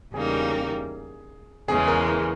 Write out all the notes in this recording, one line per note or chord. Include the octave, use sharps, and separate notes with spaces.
E2 C#3 G3 A#3 D#4 G#4
E2 C#3 E3 G#3 G#4
A#4
A#4